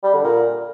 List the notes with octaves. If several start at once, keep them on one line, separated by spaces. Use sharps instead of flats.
G3
D3
A#2